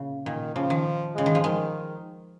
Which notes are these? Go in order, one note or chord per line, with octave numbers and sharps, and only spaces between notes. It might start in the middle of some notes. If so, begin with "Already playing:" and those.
Already playing: A#2 C#3
A#2 D#3
C#3 F3
D#3
C#3 G#3
D#3
F3
D#3 G#3